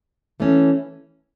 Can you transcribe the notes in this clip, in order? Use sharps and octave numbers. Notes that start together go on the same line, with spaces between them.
E3 A3 C#4